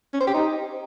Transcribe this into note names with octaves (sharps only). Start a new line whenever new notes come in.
C#4
C5
G4
D#4